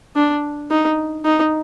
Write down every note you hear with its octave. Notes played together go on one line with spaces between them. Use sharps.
D4
D#4
D#4